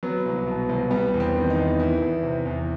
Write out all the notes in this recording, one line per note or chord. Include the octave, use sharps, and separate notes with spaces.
F#3 B3
C2
B2
C2
G3 B3
E2
C4
D#3
D#4
E2
E3 E4
E2
C3
E2